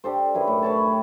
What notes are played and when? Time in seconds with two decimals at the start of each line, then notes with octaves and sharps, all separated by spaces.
0.04 D4 G4 A4 C5
0.34 F#2 E4 B4
0.47 A2
0.63 B4 C#5 A5
0.85 G4